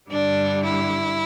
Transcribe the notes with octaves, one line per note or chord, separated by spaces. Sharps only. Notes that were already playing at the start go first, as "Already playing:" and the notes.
G2 D3 G3 D4
E4